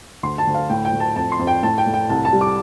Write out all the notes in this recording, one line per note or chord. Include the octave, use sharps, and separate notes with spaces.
D2 C6
A5
D2
F5
A2 G5
G5
A2
A5
F2 A5
C6
F2
G5
A2 A5
G5
A2
G5
C2 A5
A5
G3
D6